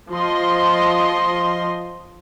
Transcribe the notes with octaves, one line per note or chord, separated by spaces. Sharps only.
F3 D#5 C6